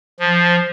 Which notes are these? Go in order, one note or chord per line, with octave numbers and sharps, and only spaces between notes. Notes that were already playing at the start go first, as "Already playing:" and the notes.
F3